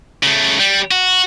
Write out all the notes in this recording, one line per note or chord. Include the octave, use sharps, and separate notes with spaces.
C#3 A3
G3
F#4